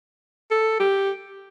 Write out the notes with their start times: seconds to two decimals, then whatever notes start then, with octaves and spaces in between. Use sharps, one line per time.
0.51 A4
0.80 G4